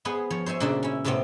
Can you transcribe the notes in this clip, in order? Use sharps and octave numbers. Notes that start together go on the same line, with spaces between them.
B3 G#4 B4 C5
F3 C#5
C5 C#5 E5 G#5
A#2 C#3 D4 F#4 A4 E5
C#4 E4
A2 C3 A3 B3 C4 F4